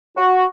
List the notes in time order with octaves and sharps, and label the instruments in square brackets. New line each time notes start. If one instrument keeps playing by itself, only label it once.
[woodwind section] F#4